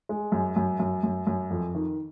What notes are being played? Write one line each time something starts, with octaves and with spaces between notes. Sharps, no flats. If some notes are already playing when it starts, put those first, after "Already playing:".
G#3
F#2
F#2
F#2
F#2
F#2
F2
D#3